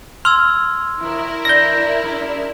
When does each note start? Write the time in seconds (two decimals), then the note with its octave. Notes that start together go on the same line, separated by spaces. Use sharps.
0.25 C6 E6 F6 G#6
1.00 F2 D#3 E4 A#4
1.45 E3 D4 D5 G6 A#6
2.03 F#2 G#3 D4